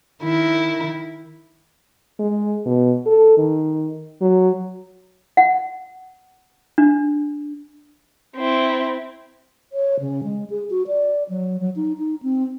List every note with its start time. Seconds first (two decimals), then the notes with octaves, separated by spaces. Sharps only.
0.22 D#3 E4
2.19 G#3
2.66 B2
3.06 A4
3.37 D#3
4.21 F#3
5.37 F#5
6.78 D4
8.36 C4 E4
9.72 C#5
10.00 C#3
10.24 G#3
10.50 G#4
10.70 F#4
10.87 D5
11.29 F#3
11.60 F#3
11.76 D#4
11.98 D#4
12.23 C4